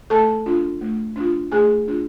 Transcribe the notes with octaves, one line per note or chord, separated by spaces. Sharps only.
A3 A4 A5
D4 F4
A3
D4 F4
A3 G#4 G#5
D4 F4